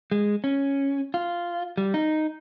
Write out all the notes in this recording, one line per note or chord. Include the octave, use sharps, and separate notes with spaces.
G#3
C#4
F4
G3
D#4